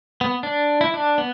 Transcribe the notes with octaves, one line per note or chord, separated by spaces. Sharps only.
B3
D4
E4
D4
B3